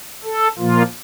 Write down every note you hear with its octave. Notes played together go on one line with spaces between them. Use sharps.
A4
A#2 F3 A#3 F4